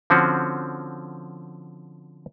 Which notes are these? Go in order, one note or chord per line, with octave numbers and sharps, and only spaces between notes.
D3 F3 C4 C#4 F#4